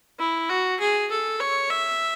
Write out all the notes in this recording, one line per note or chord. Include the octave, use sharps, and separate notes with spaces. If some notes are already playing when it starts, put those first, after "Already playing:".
E4
F#4
G#4
A4
C#5
E5